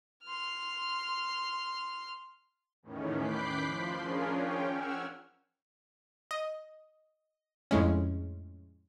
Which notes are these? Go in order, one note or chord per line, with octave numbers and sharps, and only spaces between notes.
C6 F6
E2 A2 D#3 C#4
B5 D6 F#6 G6 B6 C7
F3 C6
C#4 D4 F4 G#4 A#4
C#4 G5
F#5 E6 F6 G#6
D#5
F2 A2 G#3 C#4